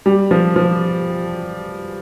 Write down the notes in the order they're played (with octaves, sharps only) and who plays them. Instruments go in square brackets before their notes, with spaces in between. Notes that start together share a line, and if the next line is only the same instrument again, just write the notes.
[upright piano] G3
F3
F3